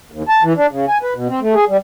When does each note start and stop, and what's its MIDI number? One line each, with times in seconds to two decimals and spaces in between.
0.12 0.23 39
0.29 0.43 81
0.43 0.53 52
0.57 0.66 62
0.71 0.85 49
0.88 0.98 80
1.03 1.14 71
1.15 1.28 47
1.29 1.40 60
1.41 1.54 57
1.54 1.65 68
1.69 1.77 55